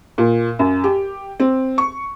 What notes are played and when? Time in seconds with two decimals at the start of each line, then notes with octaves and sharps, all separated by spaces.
0.18 A#2
0.59 F#2
0.84 G4
1.40 C4
1.78 C#6